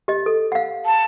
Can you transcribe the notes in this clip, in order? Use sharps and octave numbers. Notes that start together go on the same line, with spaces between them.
G4 D#5
A4
F5 F#5
A5